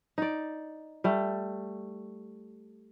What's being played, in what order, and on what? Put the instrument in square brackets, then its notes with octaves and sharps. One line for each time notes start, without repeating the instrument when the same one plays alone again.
[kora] D#4 D5
G3 A3